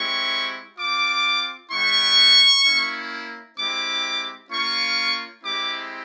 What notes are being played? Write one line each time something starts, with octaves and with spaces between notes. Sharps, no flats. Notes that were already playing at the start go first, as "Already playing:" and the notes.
Already playing: G#3 C4 E4 G4 C#6
C4 F4 D6
G3 B3 E4 C#6
A#3 C#4 E4
G#3 C4 E4 G4 D6
A#3 C#4 F4 C#6
G#3 C4 E4 G4 D6